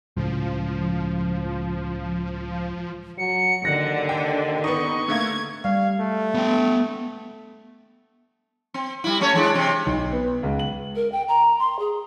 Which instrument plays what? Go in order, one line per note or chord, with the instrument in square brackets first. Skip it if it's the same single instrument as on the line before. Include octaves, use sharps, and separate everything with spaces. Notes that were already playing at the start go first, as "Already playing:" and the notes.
[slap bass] C#2 A2 C#3 [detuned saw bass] F3
[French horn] F#3 [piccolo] C#7
[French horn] D#2 [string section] D3 [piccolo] F#5 [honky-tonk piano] A#6
[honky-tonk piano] G5
[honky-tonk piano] B3 D#4 [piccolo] C#6
[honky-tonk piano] D3 A3 A#3 [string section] G#6
[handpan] G3 [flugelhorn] F5
[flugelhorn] A3
[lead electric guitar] B3 G5
[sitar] C4
G3 E4
A3 C#4 C#5
E3 G#3 D4
C3 C4
[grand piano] B1
B3
C#2
F#7
[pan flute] A#4
G5
A#5
C6
G#4